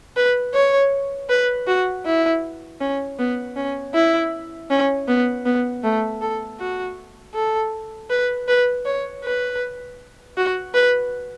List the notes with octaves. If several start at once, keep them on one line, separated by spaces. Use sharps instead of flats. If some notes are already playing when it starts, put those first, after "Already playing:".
B4
C#5
B4
F#4
E4
C#4
B3
C#4
E4
C#4
B3
B3
A3
A4
F#4
A4
B4
B4
C#5
B4
F#4
B4